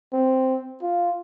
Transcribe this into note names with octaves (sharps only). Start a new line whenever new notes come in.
C4
F4